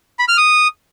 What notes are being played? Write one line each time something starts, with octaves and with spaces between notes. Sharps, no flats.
B5
F6
D#6